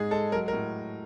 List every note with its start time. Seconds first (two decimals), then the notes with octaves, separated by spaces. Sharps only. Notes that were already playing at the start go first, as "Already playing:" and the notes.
Already playing: G#2 G#3 G#4
0.11 G#3 A4
0.32 F#3 A#4
0.48 A#4
0.53 A2